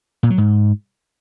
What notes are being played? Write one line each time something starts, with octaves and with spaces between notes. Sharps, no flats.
A#2
F#3
G#2